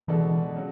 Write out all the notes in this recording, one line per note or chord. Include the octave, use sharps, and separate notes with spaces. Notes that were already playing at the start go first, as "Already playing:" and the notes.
B2 E3 G#3 D4 A4
C#3 F#3